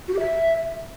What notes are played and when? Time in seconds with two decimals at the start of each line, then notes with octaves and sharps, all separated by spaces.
0.08 F#4
0.14 G4
0.20 E5